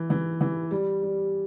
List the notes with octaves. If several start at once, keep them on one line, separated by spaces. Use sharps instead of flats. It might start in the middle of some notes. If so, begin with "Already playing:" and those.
Already playing: E3
E3
E3
G3
G3